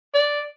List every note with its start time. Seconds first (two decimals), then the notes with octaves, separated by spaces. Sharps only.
0.14 D5